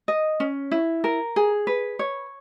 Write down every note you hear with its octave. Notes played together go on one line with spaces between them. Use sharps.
D#5
C#4
E4
A#4
G#4
B4
C#5